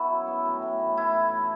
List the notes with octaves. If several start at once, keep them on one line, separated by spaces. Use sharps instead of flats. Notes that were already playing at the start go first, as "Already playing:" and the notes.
Already playing: F#3 B3 E4 F#4 A4
F#2
B3
A2
A2
E3
A2 E4
A2
A3